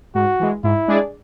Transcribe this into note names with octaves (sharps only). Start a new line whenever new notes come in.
G#2 F#4
E3 G#3
G#2 E4
G#3 D4 G#4 D5